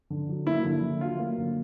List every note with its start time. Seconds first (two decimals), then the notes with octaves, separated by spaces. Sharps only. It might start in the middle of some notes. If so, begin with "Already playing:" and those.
0.10 D3
0.29 F#3
0.47 A#3 E4
0.64 D3
0.83 D3
1.01 F#3 F4
1.19 A#3
1.38 D3